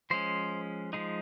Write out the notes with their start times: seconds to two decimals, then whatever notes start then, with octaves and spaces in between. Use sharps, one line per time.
0.10 F3 G#3 C#4 C5
0.93 F3 G#3 D#4